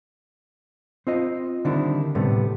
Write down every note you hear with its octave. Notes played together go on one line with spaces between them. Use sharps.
C4 F4 D#5
D3 D#3 G3 C4 D4 E4
A2 C3 G3 A3 B3